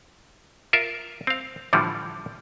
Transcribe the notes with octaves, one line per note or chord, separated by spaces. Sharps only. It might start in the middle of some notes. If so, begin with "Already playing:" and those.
F4 A#4 E5
C4 F5
A2 D3 E3 F3 G3